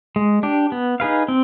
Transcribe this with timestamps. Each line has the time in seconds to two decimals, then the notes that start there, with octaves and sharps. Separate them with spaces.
0.16 G#3
0.43 D4 G4
0.72 B3
1.00 D#4 G#4 B4 F5
1.28 C4